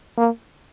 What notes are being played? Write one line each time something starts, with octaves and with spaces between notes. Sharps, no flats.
A#3